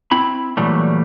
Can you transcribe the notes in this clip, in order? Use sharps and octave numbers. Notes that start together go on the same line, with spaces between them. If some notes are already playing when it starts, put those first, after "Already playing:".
C4 E4 B5
A#2 E3 F#3 G3 A3